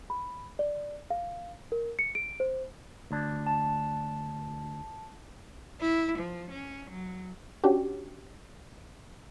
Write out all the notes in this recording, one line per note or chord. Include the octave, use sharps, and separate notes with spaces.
B5
D5
F5
A#4
C#7
D7
C5
D2 D4
A5
E4
F3
C#4
F#3
C#4 D4 F#4 G4